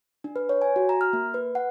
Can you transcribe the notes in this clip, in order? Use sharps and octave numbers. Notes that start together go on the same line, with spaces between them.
D4
B4
C#5
G#5
F#4
A#5
F6
A#3
B4
F#5